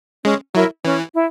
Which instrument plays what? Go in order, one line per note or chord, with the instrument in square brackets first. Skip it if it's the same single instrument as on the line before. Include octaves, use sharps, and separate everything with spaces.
[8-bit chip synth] G#3 [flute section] C#4
[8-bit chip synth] F#3 [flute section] E4 A#4 E5
[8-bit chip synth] E3 [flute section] C#4
[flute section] E4